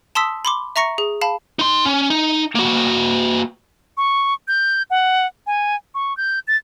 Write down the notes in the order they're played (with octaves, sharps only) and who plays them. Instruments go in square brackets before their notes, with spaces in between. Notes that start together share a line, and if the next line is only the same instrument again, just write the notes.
[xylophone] A5 C6 D#6 E6 B6
B5 C6 D6
E5 A#5 C#6 A#6 C#7
G#4
F5 A5 B5
[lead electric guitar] D#4 C6
C#4
D#4
A#3 F#4
[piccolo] C#6
G6
F#5
G#5
C#6
G6
A6